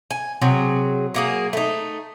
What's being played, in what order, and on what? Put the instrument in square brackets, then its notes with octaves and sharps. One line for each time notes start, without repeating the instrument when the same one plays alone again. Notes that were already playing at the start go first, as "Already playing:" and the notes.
[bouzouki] G#5
C3 F#3 G#4
F#3 A#3 G#4
A3 D#4